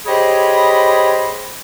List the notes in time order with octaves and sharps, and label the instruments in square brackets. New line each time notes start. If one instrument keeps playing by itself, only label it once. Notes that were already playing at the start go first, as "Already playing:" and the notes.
[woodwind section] G4 G#4 C5 C#5 D#5 B5